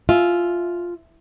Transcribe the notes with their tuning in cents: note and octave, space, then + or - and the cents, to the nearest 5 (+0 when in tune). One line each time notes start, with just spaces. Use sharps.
F4 +0 E5 +0 G#5 +30